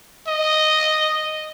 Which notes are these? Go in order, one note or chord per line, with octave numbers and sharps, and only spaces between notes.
D#5